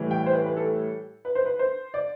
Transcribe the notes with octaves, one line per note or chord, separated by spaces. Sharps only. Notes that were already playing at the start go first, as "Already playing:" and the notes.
Already playing: A2 E3 G3
G5
C5
B4
B4
A4
B4
C5
B4
C5
D5